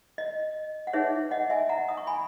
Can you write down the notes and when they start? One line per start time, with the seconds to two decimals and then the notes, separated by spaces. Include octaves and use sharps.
0.18 D#5
0.87 F#5
0.93 D#4 G#4 B4 C#5 E5
1.31 D#5 F#5
1.50 E5 G#5
1.69 F#5 A#5
1.89 D#6
1.97 C#6
2.07 G#5 B5